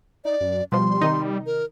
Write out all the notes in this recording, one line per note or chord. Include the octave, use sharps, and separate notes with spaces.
D#4 D5
F#2
B2 F3 G3 C6
C3 D#3 D#4
A#4